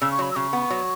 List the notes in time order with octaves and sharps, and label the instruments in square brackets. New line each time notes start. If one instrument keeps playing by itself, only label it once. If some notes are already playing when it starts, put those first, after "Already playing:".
[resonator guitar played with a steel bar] C#3 [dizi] E6
[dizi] C#6
[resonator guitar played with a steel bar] F#3 [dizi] B5
[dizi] E6
[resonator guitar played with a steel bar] C#3 [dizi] C#6
[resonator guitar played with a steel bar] B3
F#3